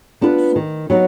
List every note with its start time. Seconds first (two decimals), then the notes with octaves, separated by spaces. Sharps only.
0.21 B3 D4 F4 B4
0.56 D#3
0.90 F#3 B3 D#4